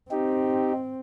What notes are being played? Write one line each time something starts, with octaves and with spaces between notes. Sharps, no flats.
C4 D#4 G4